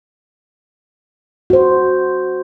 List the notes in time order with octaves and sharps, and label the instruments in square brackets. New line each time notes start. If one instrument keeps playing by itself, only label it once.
[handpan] F#4 C5